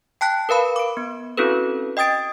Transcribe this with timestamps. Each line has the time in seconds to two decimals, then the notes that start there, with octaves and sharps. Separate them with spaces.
0.21 G5 A5 F#6 B6
0.49 A#4 B4 F5 B5
0.76 D6 D7
0.97 B3
1.38 C4 C#4 E4 F#4 A4 B4
1.97 D#5 G5 D#6 A6 D7